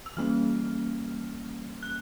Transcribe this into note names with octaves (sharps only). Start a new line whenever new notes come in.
E6
E3 G3 A#3 C#4 F6
F#6